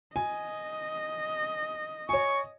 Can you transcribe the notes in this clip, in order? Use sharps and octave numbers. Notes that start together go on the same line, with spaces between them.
D#5 G#5
C#5 G#5 C#6